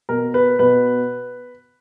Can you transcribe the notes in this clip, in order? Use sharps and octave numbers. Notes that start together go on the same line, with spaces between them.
B2 A#4
B4
B2 B4